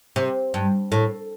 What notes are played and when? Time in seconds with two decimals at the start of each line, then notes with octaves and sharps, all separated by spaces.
0.16 C3
0.54 G2
0.92 A2